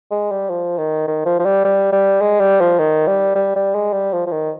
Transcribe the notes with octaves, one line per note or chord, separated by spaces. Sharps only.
G#3
G3
F3
D#3
D#3
F3
F3
G3
G3
G3
G#3
G3
F3
D#3
G3
G3
G3
G#3
G3
F3
F3
D#3